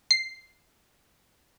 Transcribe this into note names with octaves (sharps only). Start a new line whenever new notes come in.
C7